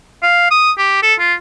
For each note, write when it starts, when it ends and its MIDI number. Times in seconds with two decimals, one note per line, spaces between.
0.23 0.47 77
0.51 0.72 87
0.78 0.99 67
1.03 1.14 69
1.20 1.34 65